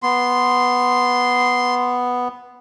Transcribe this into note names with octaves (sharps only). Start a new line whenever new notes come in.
B3 C6